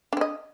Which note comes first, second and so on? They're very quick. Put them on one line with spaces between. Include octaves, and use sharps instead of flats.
D4 C4 D#5